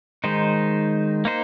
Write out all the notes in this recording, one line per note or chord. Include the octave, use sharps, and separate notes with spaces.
D#3 G#3 D#4 C5
A#3 D#4 C5